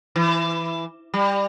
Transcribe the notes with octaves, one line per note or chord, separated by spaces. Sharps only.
E3
G3